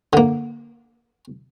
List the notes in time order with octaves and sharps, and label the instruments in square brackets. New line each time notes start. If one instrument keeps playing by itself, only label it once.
[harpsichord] D3 A#3